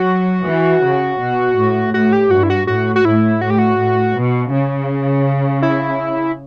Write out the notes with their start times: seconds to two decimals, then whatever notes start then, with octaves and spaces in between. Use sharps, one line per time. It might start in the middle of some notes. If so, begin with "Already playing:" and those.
Already playing: F#3 F#4
0.46 E3
0.83 C#3
1.21 B2
1.57 A2
1.94 A2 F#4
2.13 G4
2.31 G2 F#4
2.43 E4
2.50 F#4
2.67 A2 F#4
2.96 F#4
3.04 A2 E4
3.41 A2 F#4
3.50 G4
3.59 F#4
3.79 A2
4.16 B2
4.52 C#3
5.62 E4